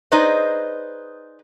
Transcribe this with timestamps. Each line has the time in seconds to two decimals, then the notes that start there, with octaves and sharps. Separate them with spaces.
0.12 D#4 G#4 B4 C5 D5 D#5